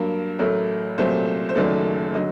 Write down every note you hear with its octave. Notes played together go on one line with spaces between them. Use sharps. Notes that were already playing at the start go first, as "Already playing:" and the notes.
Already playing: G2 F#3 A#3 A#4
A1 A2 F#3 A3 A#4
C2 A#2 F#3 A3 C5
C5
F#1 F#2 D#3 F#3 A3 D5
D3 F#3 D#5